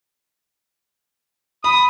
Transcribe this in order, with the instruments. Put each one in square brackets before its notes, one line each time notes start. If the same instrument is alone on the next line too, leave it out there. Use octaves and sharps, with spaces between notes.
[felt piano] B5 [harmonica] D#6